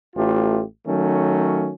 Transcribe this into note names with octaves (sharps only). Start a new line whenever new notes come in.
A1 A3 F4 G4
D#3 F#3 A3 C#4